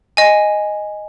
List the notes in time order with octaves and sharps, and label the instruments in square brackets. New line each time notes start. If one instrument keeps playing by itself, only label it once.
[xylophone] D#5 G#5